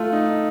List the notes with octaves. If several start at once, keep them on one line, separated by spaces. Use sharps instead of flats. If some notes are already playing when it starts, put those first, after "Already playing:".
Already playing: A3 F4
D#4